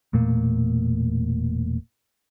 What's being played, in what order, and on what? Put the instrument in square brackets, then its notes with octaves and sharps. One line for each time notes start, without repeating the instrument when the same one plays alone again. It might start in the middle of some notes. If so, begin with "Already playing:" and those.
[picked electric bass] E1 A#2 A3 A#3